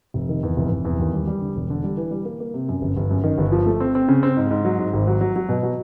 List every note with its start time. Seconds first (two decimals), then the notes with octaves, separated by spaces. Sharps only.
0.14 F1
0.29 D#3
0.43 E2
0.57 F1
0.71 F1
0.85 E2
0.99 D#2
1.13 G3
1.27 G3
1.41 D3
1.56 E1
1.70 D3
1.84 G3
1.97 E3
2.11 G3
2.25 A#3
2.40 A#3
2.54 C3
2.69 F#2
2.81 G1
2.97 G1
3.10 F#2
3.24 D#3
3.38 G1
3.52 F3
3.66 A3
3.80 C4
3.95 C4
4.08 C#3
4.23 C4
4.37 G#2
4.51 G#2
4.65 F#3
4.78 G#2
4.93 G#1
5.07 F#3
5.21 F#3
5.36 F#3
5.49 B2
5.63 F#3